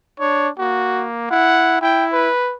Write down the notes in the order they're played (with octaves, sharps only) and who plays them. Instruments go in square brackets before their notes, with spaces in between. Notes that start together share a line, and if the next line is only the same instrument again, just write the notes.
[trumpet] D4 [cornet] C#5
[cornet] A#3 [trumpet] F#4
[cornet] E4 [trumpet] F#5
[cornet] E4 [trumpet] G5
[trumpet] B4